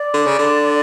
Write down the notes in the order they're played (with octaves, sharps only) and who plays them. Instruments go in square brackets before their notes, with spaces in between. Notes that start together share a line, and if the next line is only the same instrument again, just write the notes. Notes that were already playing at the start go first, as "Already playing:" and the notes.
Already playing: [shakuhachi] D5
[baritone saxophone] D3
C#3
D3